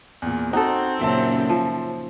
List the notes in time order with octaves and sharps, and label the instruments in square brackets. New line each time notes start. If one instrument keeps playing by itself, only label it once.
[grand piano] E2 A#2
[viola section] C4 [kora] D#4 A4 [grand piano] F#4
[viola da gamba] F#2 A#2 C#3 [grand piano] C5 E5 A5
[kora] F3